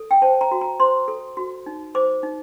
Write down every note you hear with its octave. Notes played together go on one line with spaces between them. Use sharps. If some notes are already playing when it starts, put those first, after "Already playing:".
Already playing: A4
G5
C5 A5
A#5
F#4
A#5
C5 C6
A4
F#4
D#4
C5 D6
D#4